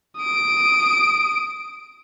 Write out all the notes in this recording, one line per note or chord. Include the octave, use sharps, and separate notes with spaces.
D#6 D7